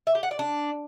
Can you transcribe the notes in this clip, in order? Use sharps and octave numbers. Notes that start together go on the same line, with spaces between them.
E5
G4
F#5
D5
D4